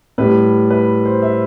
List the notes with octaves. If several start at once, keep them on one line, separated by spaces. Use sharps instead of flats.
A2 G3 B4
B4
C5
E5